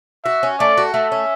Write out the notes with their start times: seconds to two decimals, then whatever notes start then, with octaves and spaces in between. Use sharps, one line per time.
0.25 F#4 E5
0.43 C#4
0.60 A3 D5
0.77 F#4
0.94 A3 E5
1.12 C#4